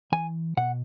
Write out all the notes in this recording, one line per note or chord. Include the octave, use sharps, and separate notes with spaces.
E3 G#5
B2 F#5